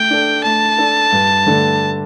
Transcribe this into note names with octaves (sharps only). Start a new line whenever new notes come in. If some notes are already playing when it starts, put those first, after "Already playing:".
Already playing: A3 G5
D4 A4
A3 A5
D4 A4
G2
D3 A3 D4 A4